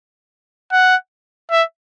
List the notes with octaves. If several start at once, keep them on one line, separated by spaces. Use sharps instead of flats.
F#5
E5